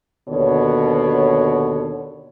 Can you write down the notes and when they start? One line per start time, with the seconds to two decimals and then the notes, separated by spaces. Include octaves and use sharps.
0.29 D#2 B2 D3 C#5